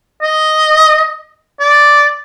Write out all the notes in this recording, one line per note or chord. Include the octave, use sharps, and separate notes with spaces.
D#5
D5